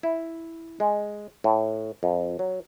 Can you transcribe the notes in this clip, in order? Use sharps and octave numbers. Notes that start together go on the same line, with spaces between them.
E4
G#3
A2
F2
F#3